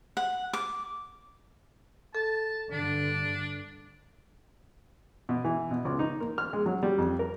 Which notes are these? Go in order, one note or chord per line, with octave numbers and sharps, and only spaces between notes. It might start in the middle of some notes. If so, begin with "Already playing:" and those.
F#5
D6
A4 A5
G2 D3 D4
B2
E3
B2
C#2
D#4
A#3
F6
G#3
F#3
G3
F2
A#4